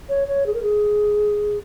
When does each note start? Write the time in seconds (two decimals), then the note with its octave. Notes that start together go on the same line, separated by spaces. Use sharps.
0.09 C#5
0.28 C#5
0.46 G#4
0.54 A#4
0.63 G#4